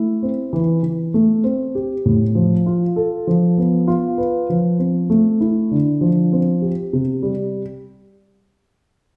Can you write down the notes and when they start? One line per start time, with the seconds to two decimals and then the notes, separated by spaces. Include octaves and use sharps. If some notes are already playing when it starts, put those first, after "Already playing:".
Already playing: A3 E4
0.23 C4
0.53 E3
0.83 E3
1.14 A3
1.44 C4
1.75 G4
2.06 A2
2.35 F3
2.66 F4
2.96 A4
3.27 F3
3.58 B3
3.88 F4
4.18 B4
4.50 F3
4.79 C4
5.10 A3
5.41 E4
5.71 D3
6.01 F3
6.32 C4
6.62 G4
6.93 C3
7.23 G3